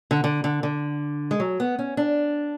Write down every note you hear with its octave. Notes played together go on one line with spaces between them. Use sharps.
D3
D3
D3
D3
G#3
F#3
B3
C#4
D4